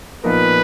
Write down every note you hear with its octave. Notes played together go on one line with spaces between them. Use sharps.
A#2 F3 B3 D#4 A#4 B4